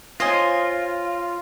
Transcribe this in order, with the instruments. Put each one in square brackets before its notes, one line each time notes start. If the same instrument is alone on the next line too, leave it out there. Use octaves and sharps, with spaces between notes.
[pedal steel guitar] F4 [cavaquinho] C5 D#5 G#5 [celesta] C#5 A#6